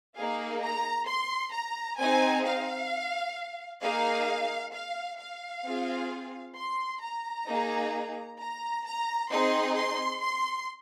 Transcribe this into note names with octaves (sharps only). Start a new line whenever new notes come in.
A#3 D#4 G#4 F5
A#5
C6
A#5
C4 D#4 G#4 G#5
F5
A#3 D#4 G#4 F5
F5
F5
C4 F4 G#4
C6
A#5
A#3 D#4 G#4
A#5
A#5
C4 D#4 G#4 C6
C6
C6